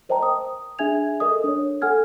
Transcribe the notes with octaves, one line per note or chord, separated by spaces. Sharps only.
A#4 C5 D#5 G5 A5 A#5
D#6
D4 G#4 E5 G#5 G#6 F7
A4 A#4 D#5 D#6
D4 C#5
A4 F#5 G#5 F6 G#6